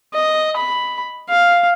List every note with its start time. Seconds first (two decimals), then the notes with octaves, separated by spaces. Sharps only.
0.13 D#5
0.56 B5
1.30 F5